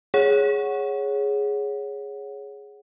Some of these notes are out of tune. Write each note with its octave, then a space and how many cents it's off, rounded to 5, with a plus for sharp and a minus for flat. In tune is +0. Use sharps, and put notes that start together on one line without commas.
G#4 +0 C#5 +0 F#5 +0